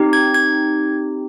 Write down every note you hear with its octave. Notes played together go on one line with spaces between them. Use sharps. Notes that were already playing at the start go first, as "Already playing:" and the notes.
Already playing: C4 D#4 G4
G#6
G#6